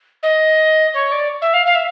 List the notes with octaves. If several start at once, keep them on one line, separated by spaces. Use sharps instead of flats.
D#5
C#5
D5
E5
F5
F5
E5